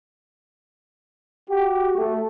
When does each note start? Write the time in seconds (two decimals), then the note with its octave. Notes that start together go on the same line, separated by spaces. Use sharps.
1.50 F#4 G4
1.97 A3